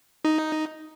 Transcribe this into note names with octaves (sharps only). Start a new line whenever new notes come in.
D#4